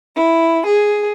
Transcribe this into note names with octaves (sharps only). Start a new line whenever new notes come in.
E4
G#4